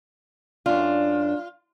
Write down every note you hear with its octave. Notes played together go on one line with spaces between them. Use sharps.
F#2 D4 F4